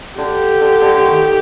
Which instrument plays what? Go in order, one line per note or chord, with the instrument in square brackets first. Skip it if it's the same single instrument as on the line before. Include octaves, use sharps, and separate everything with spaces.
[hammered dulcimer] D3 [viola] G4
[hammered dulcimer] D3
D3
D3
D#3